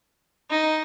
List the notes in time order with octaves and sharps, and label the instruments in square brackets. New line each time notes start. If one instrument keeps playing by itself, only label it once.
[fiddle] D#4